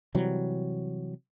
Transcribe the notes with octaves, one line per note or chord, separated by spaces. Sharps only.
C3 E3 F#3 G3